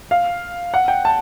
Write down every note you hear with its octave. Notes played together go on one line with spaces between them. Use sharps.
F5
F#5
G5
A5